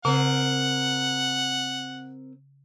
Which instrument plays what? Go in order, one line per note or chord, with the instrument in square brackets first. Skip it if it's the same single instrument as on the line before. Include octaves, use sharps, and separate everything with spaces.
[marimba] C#3 [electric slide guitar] C4 A#4 [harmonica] F#5